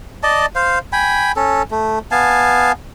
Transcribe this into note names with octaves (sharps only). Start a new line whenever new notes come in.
D5 D#5 A5
C5 F5
G5 G#5 B5
C#4 A4
A3
B3 F5 G#5 A5